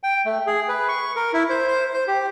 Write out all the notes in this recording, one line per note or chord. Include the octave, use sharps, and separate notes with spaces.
G5
A3
G#4
B4
C#6
A#4
E4
C5
C5
C5
G4